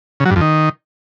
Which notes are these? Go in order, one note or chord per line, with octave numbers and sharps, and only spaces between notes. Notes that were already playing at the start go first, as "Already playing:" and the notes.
C#3
F#3
G2
F2
D#3